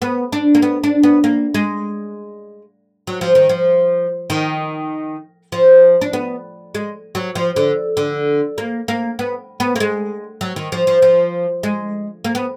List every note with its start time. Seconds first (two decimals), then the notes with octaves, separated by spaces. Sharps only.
0.02 B3
0.32 D4
0.55 A#3
0.62 B3
0.84 D4
1.03 B3
1.24 A#3
1.54 G#3
3.07 F#3
3.21 F3
3.35 D#3
3.49 F3
4.30 D#3
5.52 F3
6.01 D4
6.13 B3
6.75 G#3
7.15 F#3
7.35 F3
7.56 D3
7.97 D3
8.58 A#3
8.88 A#3
9.19 B3
9.60 B3
9.76 A#3
9.80 G#3
10.41 F#3
10.56 D#3
10.72 F3
10.87 F3
11.02 F3
11.63 G#3
12.24 A#3
12.35 B3